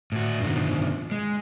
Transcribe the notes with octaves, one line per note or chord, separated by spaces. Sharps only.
A2 F#4
G2 B2 D3 D#3 F3
G#3